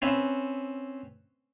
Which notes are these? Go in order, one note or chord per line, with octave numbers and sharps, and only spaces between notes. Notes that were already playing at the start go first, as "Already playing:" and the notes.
C4 C#4 B4 E5